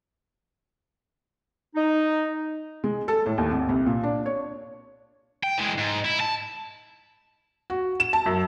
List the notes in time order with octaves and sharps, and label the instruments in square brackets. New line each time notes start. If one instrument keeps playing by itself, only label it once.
[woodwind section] D#4
[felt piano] G#3
A4
A2
D#2
G#1
C2
A#2
D4
C#5
[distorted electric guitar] G5
E3 G#3
G#2
E4
A5
[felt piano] F#4
E7
A5
F#2